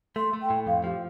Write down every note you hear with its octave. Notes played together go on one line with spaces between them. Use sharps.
A3 C6
A3
G5
A2
F2 F5
F3 G4